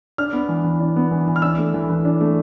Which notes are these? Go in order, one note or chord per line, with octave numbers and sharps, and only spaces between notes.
D4 F6
B3
E3
E3
D4
B3
E3
E3
F6
D4 E6
A3
E3
E3
D4
A3